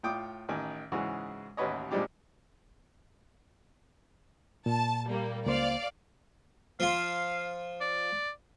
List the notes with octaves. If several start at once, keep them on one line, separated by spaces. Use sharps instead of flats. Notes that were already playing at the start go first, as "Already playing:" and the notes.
A2 F4 G5 D6 D#6
A1 D#3 G#5
G#2 C#3 E3 G#3 F#4
A1 D#2 F#4 B4 C#5 D#5
A#2 F3 G3 G#3 D4 G4
A#2 A5
G3 A#3
C#2 A#3 C5 D5 F5
F3 F4 F5
D5